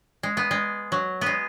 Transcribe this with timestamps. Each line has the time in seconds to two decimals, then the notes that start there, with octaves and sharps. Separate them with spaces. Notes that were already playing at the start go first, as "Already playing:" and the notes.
0.23 G#3
0.37 B3
0.51 G#3
0.92 F#3
1.21 G#3 B3